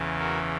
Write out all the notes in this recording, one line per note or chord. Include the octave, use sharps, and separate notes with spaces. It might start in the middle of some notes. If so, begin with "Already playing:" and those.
Already playing: E2 C#3 E3
F#4 A#4